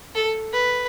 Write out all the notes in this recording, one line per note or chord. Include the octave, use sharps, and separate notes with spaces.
A4
B4